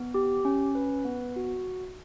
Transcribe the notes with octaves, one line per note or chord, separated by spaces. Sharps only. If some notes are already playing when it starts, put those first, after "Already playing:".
Already playing: B3
G4
C#4
B4
B3
F#4